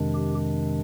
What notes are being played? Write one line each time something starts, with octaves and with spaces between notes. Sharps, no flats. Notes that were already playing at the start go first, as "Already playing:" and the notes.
Already playing: F2 C3 D#3 G#3 D4
G4